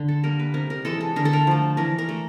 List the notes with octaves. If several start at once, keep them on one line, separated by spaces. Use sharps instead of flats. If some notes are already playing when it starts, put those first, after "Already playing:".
Already playing: D3
A4
G3 A#3 A#4
B4
C3 A#4
A#4
E3 G#3 A4
A4
D3 A#4
A4
A#4
F3 A3
E3 A#4
A#4
A3